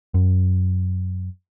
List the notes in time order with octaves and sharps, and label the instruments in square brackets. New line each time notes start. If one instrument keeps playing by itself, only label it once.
[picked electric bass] F#2